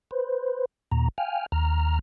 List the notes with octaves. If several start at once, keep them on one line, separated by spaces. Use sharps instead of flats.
B4 C5
D#2 A#2 A#5
F5 G5 G#5 F6
D#2 A#5 F6